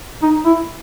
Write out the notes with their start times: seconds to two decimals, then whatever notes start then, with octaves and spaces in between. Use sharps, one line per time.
0.22 D#4
0.46 E4